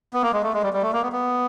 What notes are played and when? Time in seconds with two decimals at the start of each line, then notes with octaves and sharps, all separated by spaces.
0.14 B3
0.23 A#3
0.33 G#3
0.43 A3
0.54 G#3
0.63 G3
0.73 G3
0.82 A3
0.93 A#3
1.02 B3
1.12 B3